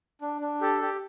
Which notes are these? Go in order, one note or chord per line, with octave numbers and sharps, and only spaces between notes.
D4
D4
G4 A4
G4